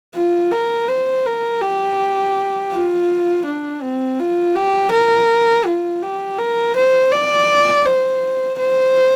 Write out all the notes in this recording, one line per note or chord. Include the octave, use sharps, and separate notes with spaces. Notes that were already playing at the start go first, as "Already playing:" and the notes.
F4
A#4
C5
A#4
G4
F4
D4
C4
F4
G4
A#4
F4
G4
A#4
C5
D5
C5
C5